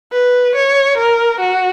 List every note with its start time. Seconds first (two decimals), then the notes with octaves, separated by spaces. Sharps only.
0.13 B4
0.55 C#5
0.98 A#4
1.40 F#4